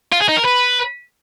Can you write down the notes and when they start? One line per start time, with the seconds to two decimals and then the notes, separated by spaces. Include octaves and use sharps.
0.12 F4
0.20 G#4
0.28 D#4
0.36 A#4
0.44 B4